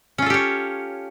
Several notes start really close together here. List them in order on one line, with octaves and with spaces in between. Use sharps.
C#4 F4 A4 G4 C#5